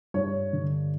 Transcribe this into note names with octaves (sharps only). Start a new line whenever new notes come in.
G2 C#5
D3